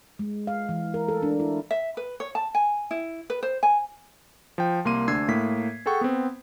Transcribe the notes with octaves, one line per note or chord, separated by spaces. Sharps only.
G#3
F5
E3
A#4
A4
D4
E4
E5
B4
C#5
A5
G#5
E4
B4
C5
G#5
F3 G5
C2 A#3 C6 D#7
D2 D4 E6 G#6 C7
A2 A#3 B6
G#4 A4 F#5 G5 C#6
B3 C4